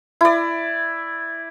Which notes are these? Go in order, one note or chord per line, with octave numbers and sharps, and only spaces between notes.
E4 D5